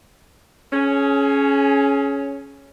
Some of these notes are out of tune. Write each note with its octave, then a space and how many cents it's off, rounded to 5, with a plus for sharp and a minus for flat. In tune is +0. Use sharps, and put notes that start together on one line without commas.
C#4 +0 G#4 +30